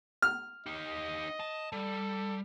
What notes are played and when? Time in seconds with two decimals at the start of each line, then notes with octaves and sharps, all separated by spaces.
0.22 F6
0.66 D#4 G4 D#5
1.40 A5
1.72 G3 A4